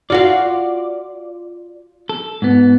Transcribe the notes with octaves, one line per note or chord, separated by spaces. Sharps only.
F4 F#4 D5 F5
A4
G#2 B3